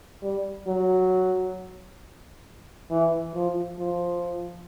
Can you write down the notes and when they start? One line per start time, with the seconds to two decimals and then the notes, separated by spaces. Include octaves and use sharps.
0.23 G3
0.67 F#3
2.91 E3
3.35 F3
3.80 F3